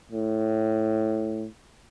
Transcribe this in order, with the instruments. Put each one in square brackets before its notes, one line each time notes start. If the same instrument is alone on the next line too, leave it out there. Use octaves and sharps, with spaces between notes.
[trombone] A2